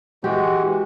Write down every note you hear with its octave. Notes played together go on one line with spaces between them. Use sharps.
E3 G#3 F#4 G4